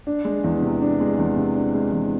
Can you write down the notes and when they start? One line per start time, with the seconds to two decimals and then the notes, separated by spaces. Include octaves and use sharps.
0.07 D4
0.25 G#3
0.44 E2
0.62 C3
0.82 D4
1.00 G#3
1.18 E2
1.37 C3
1.56 D4
1.74 G#3
1.92 E2